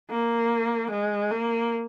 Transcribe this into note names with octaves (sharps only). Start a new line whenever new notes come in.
A#3
G#3
A#3